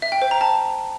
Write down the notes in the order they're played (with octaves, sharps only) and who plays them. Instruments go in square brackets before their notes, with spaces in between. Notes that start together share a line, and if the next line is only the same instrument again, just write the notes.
[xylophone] E5
G5
C5
A#5
A5